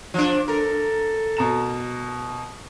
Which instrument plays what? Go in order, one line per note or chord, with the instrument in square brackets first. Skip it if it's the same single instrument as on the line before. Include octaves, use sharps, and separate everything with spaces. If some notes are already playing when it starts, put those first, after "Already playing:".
[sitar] F3 D4
[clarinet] A4 [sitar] A#4
[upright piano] B2 A#5 E7